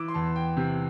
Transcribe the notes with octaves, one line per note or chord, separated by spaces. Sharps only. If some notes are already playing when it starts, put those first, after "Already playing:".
Already playing: E3 D6 E6
C6
E2 A5
G5
C3